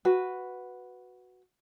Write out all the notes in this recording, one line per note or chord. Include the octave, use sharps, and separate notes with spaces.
F#4 B4